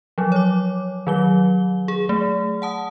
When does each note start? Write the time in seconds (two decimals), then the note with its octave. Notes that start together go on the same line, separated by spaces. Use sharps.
0.18 F3 F#3
0.32 C#5 D6
1.07 D#3 F#3 G7
1.88 G#4
2.09 A3
2.62 F#5 A5 D#6